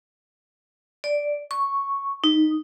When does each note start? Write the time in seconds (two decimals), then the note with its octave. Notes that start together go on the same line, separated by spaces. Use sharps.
1.04 D5
1.51 C#6
2.24 D#4